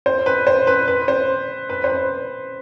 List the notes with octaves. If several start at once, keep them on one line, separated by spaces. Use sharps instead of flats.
C5
B4
C5
B4
B4
C5
B4
C5
B4